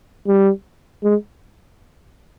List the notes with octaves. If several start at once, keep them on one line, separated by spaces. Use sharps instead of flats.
G3
G#3